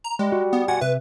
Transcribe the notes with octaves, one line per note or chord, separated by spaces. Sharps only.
A#5
G3 G#3
F#4
B3
F#4 D5 F#5 G#5
C3 B4 E5